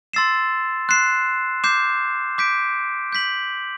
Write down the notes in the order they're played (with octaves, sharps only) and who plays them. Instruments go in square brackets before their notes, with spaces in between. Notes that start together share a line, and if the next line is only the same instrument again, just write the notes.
[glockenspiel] C6 E6 A6 C7 E7
C6 F#6 C7 E7
D6 G6 C7 E7
D6 G6 B6 D7
G6 B6 F#7